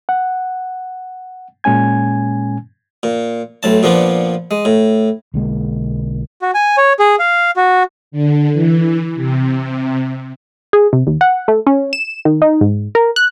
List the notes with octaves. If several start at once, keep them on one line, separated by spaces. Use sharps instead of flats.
F#5
A#2 G#3 C#4 G#5 G#6
A#2
B1 A2 A5
A#2 F3 B3 D4
G#3
A2
B1 D3 G#3 A#3
F#4
G#5
C#5
G#4
F5
F#4
D3
E3
C3
G#4
C3
D#2
F#5
A3
C#4
E7
D#3
D#4
G#2
A#4
F#6